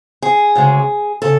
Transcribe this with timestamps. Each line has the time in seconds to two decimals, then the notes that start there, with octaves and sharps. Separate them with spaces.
0.22 G#4
0.55 D2 C#3 G#3
1.22 C#3 A4